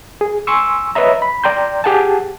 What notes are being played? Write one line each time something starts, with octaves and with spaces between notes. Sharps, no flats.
G#4
G#5 C6 C#6 E6
B4 C#5 D#5 E5 A#5
B5
D5 G5 A#5 C6 G6
G4 G#4 F#5 G#5 A5